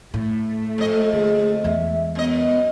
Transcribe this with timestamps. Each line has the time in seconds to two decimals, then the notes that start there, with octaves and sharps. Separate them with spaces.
0.14 A2 A3
0.78 F2 A4 D#5
1.13 D3 G#4
1.64 E2 G#3 E5
2.15 F#2 B3 D#5